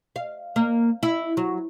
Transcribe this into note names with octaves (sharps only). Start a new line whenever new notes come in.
F5
A#3
E4
F#3